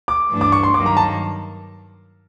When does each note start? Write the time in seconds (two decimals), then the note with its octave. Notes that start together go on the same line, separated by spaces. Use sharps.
0.08 D6
0.30 G2 E3 A3 D4
0.41 D6
0.52 C#6
0.63 C6
0.74 G2 D#3 F#3 A#3 D6
0.86 A#5
0.97 A5